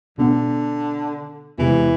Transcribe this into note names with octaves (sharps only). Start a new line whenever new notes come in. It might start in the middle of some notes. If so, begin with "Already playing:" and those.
B2 D3 B3 D4
E2 C3 E3 G#3